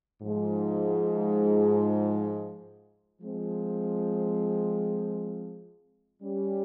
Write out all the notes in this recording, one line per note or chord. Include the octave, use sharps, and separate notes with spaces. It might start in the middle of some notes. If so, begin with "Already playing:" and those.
G#2 F3 G#3
F3 G#3 C4
G3 C#4 G4